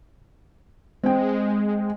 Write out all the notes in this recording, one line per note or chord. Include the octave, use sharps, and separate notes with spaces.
G#3 C4 G5